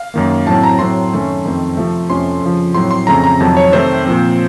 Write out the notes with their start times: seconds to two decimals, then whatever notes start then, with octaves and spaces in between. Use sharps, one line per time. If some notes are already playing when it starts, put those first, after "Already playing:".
Already playing: F5
0.14 F#2 D#3 A#3
0.46 A2 F#3 C4 A5
0.63 A#5
0.79 A2 F#3 C4 C6
1.12 F#2 D#3 A3 C#4
1.45 F2 D#3 A3 C4
1.77 C3 F3 A3
2.10 F2 C3 F3 A3 C#4 C6
2.42 F2 C#3 F3
2.74 A2 F#3 C4 C6
2.91 C6
3.07 F2 C#3 A3 C4 A#5
3.24 A#5
3.40 F2 C3 D#3 F#3 A5
3.57 C#5
3.72 C3 D#3 A3 C4 C5
4.05 A#2 F3 C4